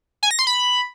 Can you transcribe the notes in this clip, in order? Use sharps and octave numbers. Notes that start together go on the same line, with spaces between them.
G#5
A#6
C6
B5